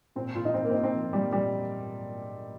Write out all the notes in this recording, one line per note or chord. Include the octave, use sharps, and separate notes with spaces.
A#2 C4
A#2 F4
D#4
A#2 C4
A#3
C4
A#2 D#4
C4
F3
A#2 G3
A#2 G3